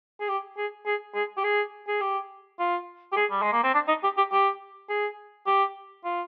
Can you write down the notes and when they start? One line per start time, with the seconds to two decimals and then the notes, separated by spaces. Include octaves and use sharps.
0.20 G#4
0.29 G4
0.57 G#4
0.86 G#4
1.15 G#4
1.37 G4
1.44 G#4
1.88 G#4
2.01 G4
2.59 F4
3.12 G4
3.16 G#4
3.31 G3
3.42 G#3
3.53 A#3
3.63 C4
3.74 D4
3.88 D#4
4.03 G4
4.17 G4
4.32 G4
4.89 G#4
5.47 G4
6.05 F4